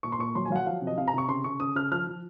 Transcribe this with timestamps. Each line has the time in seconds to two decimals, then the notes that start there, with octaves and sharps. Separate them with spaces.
0.03 A#2 C#6
0.12 C6
0.19 A#2 C#6
0.35 F#3 C6
0.45 G#5
0.50 F#3 F5
0.56 F#5
0.66 F3 F5
0.82 C3
0.87 D#5
0.98 C3 F5
1.08 A#5
1.14 C3 C#6
1.28 C#3 C6
1.44 C#3 C#6
1.60 C#3 D#6
1.75 C#3 F6
1.92 F3 F6
2.07 F3